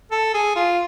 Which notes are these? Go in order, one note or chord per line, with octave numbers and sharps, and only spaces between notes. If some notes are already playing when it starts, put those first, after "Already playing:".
A4
G#4
F4